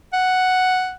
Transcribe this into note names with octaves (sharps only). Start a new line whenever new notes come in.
F#5